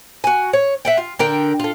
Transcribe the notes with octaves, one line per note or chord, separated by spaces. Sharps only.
F#4 G#5
C#5
E5 F#5 G5
F4
D3 A#4 G5
F4 A4